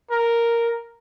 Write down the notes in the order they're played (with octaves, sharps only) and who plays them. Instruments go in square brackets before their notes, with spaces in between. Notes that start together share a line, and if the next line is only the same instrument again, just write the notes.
[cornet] A#4